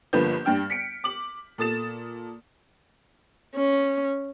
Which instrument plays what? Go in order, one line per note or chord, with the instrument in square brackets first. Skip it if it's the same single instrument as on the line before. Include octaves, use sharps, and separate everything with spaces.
[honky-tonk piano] G1 D3 F3 A#3 B4 G6
G2 D4 G5 F6
B6 C#7 D7
D6 F#7
A#2 A4 D#6 A6 E7
[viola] C#4